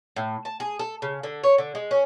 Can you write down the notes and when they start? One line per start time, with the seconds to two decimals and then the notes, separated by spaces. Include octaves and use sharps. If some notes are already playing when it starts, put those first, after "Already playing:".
0.16 A2
0.45 A5
0.60 G#4
0.79 A4
1.02 C#3
1.23 D3
1.43 C#5
1.58 D3
1.75 G#3
1.91 C#4